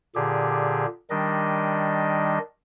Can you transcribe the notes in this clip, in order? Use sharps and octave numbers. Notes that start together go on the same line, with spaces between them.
A#2 D3 G4 G#4
D#3 G3 D4 D#5